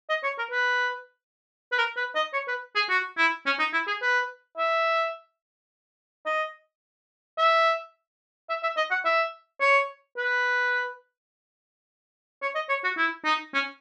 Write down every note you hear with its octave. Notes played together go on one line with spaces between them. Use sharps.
D#5
C#5
A#4
B4
B4
A#4
B4
D#5
C#5
B4
G#4
F#4
E4
C#4
D#4
E4
G#4
B4
E5
D#5
E5
E5
E5
D#5
F#5
E5
C#5
B4
C#5
D#5
C#5
F#4
E4
D#4
C#4